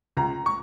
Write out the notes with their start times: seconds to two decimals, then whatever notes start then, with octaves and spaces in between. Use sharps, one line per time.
0.17 C#2 A#5
0.46 C#6